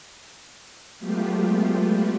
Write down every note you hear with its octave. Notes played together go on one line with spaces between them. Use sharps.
F#3 G#3 A3 B3 F4 G4